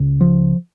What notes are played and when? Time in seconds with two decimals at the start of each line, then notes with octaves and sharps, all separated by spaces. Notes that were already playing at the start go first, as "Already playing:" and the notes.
Already playing: C#2 C#3
0.21 F3